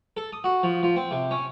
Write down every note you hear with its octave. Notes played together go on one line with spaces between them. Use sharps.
A4
D#6
F#4
F3
F3
C4
C3
C#4